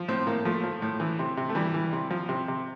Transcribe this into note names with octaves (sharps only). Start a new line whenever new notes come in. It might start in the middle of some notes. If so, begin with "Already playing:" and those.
Already playing: F3
A2 C4
A2 A#3
F3 A3
F3
A2
E3
C3
C3
A3
E3 G3
E3
C3
F3
C3
C3